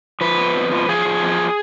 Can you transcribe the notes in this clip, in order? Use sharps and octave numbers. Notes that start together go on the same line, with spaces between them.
F3 B4
B3
F2
F3
F3 G#4
F3
F2